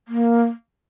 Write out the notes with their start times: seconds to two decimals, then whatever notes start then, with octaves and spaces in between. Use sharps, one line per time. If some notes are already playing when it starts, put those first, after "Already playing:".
0.08 A#3